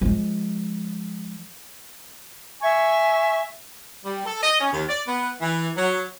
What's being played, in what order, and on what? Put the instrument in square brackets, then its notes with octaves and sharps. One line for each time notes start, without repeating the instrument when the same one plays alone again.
[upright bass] F3 G#3
[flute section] E5 G#5 C#6
[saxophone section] G3
A4
D#5
C#4
D#2
D5
B3
E3
F#3